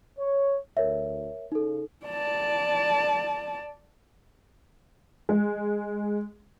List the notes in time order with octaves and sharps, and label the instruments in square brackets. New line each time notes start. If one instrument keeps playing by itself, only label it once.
[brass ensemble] C#5
[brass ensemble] D2 [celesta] A#4 C#5 E5
[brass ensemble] C#3 [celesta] D#4 A4
[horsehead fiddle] D5 A5
[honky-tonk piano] G#3